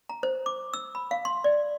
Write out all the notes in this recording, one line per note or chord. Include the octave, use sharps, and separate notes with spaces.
A#5
C5
D6
E6
B5
F5
C6
D5